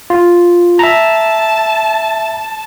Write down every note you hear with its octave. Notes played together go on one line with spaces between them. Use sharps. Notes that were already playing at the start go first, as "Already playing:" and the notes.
F4
E5 A5 A#5